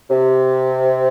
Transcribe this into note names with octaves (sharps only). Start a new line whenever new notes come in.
C3